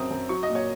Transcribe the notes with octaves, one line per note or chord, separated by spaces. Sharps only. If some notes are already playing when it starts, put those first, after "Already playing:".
Already playing: F#2 F#3 C4 D#6
F#2
F#3 C#6
D#5
A#2
C#5